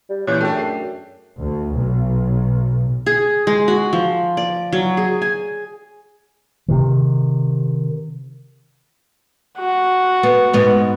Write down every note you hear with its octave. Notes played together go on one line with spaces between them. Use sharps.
G3
A#2 E3 C#4 F#6 G6
F#2 A3 D4 G#4 G5 A5
C7
D2
B1
G#4
G#3
F#4
F3
D5
F#3
G#4
G#5
C3 D#3
F#4
B3
G#2 B3